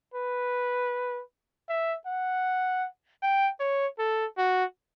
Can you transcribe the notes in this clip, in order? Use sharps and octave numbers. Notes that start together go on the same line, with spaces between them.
B4
E5
F#5
G5
C#5
A4
F#4